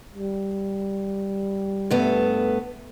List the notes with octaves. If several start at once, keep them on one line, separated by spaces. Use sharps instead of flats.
G3
G2 A3 B3